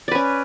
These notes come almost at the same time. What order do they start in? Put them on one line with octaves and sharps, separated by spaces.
D5 B4 C#4